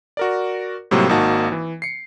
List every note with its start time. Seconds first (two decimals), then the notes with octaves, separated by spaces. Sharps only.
0.17 F#4 A#4 D5
0.91 A2 C3 F#3 G3 A#3 F4
1.09 G#1 A#3 D#4 F#4 A5
1.52 E3
1.82 C7 C#7